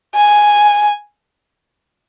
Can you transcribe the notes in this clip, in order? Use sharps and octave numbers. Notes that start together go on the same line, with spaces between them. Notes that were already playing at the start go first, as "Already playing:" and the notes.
G#5